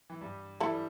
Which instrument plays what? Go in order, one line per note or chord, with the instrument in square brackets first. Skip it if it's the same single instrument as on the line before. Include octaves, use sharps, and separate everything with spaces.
[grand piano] E3
G2 G3
[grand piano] E3 [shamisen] E4 A4
[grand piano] G3